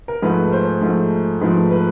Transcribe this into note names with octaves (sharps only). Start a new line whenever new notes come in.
A#4
G#2 F3 A3 B4
C5
G#2 F3 A3
G#2 F3 A3 B4
B4